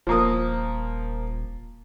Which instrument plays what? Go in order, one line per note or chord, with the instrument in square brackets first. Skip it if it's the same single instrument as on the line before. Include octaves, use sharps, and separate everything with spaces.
[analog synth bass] D#1 [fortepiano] F3 A#3 D#6